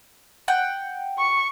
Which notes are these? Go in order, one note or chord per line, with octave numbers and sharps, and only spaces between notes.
F#5 G5
C#6